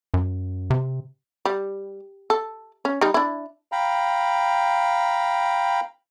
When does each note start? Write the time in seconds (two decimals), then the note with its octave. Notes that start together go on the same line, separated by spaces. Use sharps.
0.14 F#2
0.70 C3
1.45 G3
2.30 A4
2.85 C#4
3.01 G3 D#4
3.14 D4 E4
3.72 F5 G5 A#5 B5